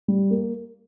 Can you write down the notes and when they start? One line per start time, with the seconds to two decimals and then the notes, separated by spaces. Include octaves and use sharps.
0.08 G3
0.31 A#3